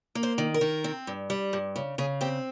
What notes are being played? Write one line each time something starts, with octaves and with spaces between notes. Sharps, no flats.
A#3
C5
D#3
A#4
D#3
C4
G2
G3
G2
C#3
C#3 G#4
C4 G4